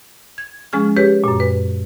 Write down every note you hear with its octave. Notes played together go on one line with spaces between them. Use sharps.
G#6
F3 G#3 C#4 G#4 F6
G4 G#4 B4 C#5
F#2 A#2
B4